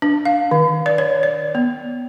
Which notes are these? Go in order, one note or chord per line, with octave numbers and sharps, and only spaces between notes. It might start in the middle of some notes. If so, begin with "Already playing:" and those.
D4
F5
D#3
D5
C#5
D5
B3